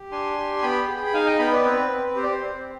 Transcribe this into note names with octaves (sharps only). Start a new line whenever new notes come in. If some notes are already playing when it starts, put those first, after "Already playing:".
Already playing: G4
D4 G#5 C6
G4
B3 G5 B5
G#4
B5
D#4 F5 G#5
D#5 G5
B3 G5 B5
B4 D5
C4 B4
C4
G4 C5
D5
C5
C4